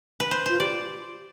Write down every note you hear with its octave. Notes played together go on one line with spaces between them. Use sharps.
B4
C5
F4 C5
G4 D5